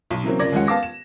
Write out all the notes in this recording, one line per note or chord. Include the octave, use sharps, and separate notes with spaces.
B1
C#3 E3 F#3 A#3 C4
G1 C#3 A#3 D5 G#6 A#6
D#2 F3 G#3 C#4 F#5
B3 F5 A5 D6 A#6
E7